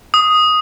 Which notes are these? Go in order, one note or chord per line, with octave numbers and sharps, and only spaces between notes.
D#6